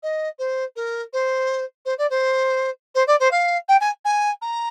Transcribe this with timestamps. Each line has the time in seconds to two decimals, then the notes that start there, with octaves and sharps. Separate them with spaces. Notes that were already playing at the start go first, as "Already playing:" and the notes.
0.03 D#5
0.38 C5
0.76 A#4
1.13 C5
1.85 C5
1.98 D5
2.10 C5
2.95 C5
3.07 D5
3.20 C5
3.31 F5
3.68 G5
3.80 G#5
4.05 G#5
4.41 A#5